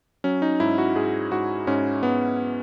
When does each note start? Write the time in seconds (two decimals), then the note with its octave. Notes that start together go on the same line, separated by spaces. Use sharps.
0.24 F#3 C#4
0.42 D#4
0.60 G#2 E4
0.78 F#4
0.95 G#2 G#4
1.32 G#2 F#4
1.67 G#2 C#4
2.03 G#2 B3